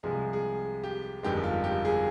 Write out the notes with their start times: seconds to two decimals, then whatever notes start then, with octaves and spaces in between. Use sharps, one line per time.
0.03 C2 C3 F3 G#3 G#4
0.33 G#4
0.84 G4
1.23 G1 F2 D#3 G#3 G4
1.43 F4
1.64 G4
1.85 G#4